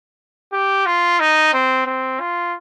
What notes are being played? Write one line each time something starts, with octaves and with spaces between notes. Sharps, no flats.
G4
F4
D#4
C4
C4
F4